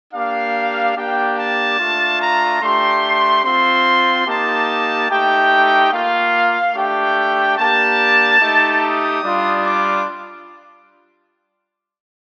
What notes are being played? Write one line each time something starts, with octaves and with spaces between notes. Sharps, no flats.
A#3 D4 G4 F5
A#3 D4 G4 G5
A5
A3 D4 F4
A#5
A3 D4 G4 C6
C4 F4 C6
A#3 D#4 G4 A5
A3 D#4 G4 G5
A#3 F4 F5
A3 D4 G4 G5
A#3 D4 G4 A5
A3 D#4 G4
D#6
G3 D4 F4
D6